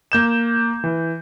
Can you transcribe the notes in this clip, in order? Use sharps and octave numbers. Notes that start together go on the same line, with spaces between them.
A#3 G6 E7
E3